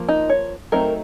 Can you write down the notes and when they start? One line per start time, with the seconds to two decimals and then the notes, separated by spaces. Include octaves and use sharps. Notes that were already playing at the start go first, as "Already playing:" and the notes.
Already playing: F3 A#3
0.08 D#4
0.29 C#5
0.72 F#3 A3 C4 D#4 A#4